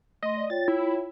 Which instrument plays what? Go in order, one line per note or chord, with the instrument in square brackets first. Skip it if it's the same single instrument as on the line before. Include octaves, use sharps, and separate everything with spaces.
[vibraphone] A3 C6 [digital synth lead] D#5
[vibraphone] D5
[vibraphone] F4 C#5 G5 [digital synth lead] A6
[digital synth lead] E4